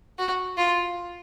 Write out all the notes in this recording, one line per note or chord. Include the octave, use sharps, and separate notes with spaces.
F#4
F4